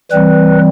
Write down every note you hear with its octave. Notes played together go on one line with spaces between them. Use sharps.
E3 G3 C4 B4